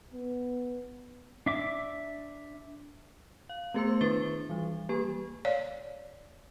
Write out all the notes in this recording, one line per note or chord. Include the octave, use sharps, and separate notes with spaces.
B3
D4 E5 D6
F5
A3 B3 G#4 C5 C6 E6
D#3 D4 B4 C#6 A6 G7
E3 G3
G3 A#3 G4 B4 C#6
C#5 D5 F5